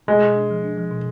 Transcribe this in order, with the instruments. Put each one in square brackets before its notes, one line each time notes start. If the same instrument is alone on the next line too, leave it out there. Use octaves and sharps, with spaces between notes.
[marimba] B2 [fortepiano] G#3
[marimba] B2
D4
F3
D4
F3
B2